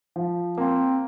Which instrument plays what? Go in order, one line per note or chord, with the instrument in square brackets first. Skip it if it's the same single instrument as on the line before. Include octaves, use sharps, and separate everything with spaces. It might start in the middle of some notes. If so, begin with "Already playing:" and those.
[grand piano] F3
[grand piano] A#3 [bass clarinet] C4